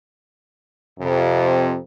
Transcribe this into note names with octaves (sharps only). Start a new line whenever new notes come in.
F2 C3